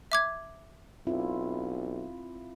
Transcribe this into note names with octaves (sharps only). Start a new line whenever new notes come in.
E5 D6 G#6
B1 C4 E4 F4